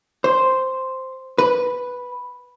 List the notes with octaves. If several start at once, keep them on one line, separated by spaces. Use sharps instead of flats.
C5
B4